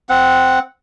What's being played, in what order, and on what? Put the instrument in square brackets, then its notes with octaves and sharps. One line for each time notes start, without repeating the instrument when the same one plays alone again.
[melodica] C4 F#5